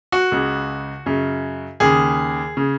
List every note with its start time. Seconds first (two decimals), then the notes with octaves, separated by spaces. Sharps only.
0.12 F#4
0.32 C#2 C#3
1.06 F#2 C#3
1.80 D#2 C#3 G#4
2.57 C#3